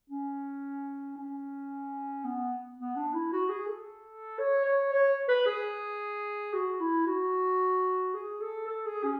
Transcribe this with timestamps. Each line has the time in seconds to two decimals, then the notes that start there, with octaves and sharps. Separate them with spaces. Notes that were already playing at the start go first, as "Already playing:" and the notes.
0.10 C#4
1.17 C#4
2.25 B3
2.78 B3
2.96 D4
3.13 E4
3.32 F#4
3.49 G#4
3.67 A4
4.39 C#5
4.65 C#5
4.93 C#5
5.28 B4
5.46 G#4
6.54 F#4
6.80 E4
7.07 F#4
8.14 G#4
8.41 A4
8.67 A4
8.86 G#4
9.04 C#4